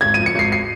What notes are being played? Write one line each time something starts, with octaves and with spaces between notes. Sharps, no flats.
G#1 G#6
F3 D#7
C#7
G#1 C7
C7